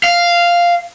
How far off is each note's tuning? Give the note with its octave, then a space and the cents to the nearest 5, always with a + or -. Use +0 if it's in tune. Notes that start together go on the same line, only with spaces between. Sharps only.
F5 -5